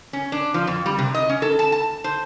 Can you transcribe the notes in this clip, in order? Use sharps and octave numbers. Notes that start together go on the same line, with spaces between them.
C#4
D4
F3
F2
G3
C3
D#5
C#4
A4
A5
A5
C5